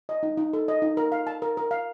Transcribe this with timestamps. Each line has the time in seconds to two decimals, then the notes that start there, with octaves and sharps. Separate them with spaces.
0.09 D#5
0.23 D#4
0.37 D#4
0.53 A4
0.68 D#5
0.82 D#4
0.97 A#4
1.12 F5
1.27 A5
1.42 A#4
1.57 A#4
1.71 F5